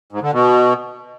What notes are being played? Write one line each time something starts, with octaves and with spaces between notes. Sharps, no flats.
G#2
D3
B2